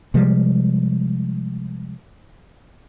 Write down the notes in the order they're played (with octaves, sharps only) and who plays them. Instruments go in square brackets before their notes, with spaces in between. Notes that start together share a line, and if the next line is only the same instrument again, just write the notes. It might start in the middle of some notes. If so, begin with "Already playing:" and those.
[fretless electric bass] C3 F3 G3 G#3